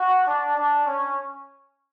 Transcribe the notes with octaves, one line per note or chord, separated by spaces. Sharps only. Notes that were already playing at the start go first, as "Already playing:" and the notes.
Already playing: F#4
D4
D4
C#4